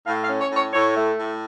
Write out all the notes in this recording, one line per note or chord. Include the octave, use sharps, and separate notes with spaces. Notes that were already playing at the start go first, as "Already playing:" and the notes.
A2 F5
F5
C#4
C#5
A2
C#5
A2 C#5
A3
A2